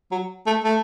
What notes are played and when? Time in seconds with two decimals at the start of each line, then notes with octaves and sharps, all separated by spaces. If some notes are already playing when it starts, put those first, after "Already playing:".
0.12 F#3
0.47 A3
0.64 A3